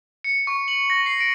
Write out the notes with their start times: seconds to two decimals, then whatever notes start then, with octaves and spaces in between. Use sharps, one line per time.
0.24 C#7
0.47 C#6
0.68 F#7
0.90 A#6
1.06 C7
1.21 D7